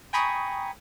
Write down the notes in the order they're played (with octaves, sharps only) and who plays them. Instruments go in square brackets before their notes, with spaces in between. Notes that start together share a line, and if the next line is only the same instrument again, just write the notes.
[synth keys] G5 G#5 A#5 B5 C#6 D#6